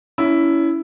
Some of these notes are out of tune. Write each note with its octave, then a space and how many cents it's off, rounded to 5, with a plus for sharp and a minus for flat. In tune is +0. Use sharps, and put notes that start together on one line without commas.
C#4 +25 E4 +0